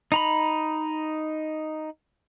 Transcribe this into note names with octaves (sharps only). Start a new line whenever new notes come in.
D#4 A#5 B5